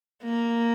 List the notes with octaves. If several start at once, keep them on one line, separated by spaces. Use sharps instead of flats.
A#3